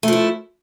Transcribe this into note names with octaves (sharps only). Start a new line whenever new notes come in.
F3 A3 E4